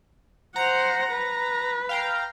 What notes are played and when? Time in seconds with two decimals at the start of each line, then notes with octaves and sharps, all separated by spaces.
0.56 C5 F#5 A#5
1.12 B4
1.89 F5 G5 A#5